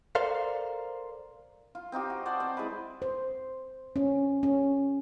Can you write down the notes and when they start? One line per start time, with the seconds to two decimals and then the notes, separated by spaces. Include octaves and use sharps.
0.15 A4 A#4 C5 D5 F5
1.75 F4
1.92 C4 D#4 F4 G4
2.10 F#4
2.26 C5 D5 F#5 A5
2.40 C4
2.57 G#3 E4 B4
3.02 C5
3.96 C#4
4.43 C#4